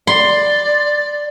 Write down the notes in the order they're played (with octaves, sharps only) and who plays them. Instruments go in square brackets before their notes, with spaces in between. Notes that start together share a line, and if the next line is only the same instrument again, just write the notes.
[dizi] D5 [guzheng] C6